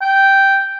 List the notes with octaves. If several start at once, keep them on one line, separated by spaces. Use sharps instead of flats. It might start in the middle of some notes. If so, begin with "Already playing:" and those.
G5